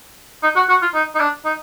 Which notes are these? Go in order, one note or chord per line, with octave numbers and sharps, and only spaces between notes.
D#4
F#4
F#4
F4
D#4
D#4
D4
D#4